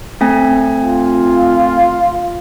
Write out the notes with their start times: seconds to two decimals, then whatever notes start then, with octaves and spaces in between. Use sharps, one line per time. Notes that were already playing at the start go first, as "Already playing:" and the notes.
0.21 A3 C4 G#5
0.85 F4